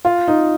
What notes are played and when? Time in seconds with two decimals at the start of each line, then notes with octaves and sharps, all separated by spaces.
0.05 F4
0.28 D#4